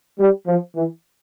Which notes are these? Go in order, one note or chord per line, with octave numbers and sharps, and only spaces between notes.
G3
F3
E3